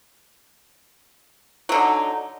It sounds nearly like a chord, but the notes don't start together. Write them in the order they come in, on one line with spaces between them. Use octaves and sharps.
F#3 D3 D#4